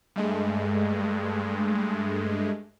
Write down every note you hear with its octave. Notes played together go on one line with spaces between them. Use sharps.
G2 G#3 A3